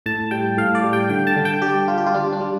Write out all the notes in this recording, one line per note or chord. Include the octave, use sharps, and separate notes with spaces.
A2 A5
G3 G5
A2 F5
D5
G3
G5
D3 G5
A5
D3
G5
G3 G4
G3 F4
G4
F4
G3 D4
D4
G3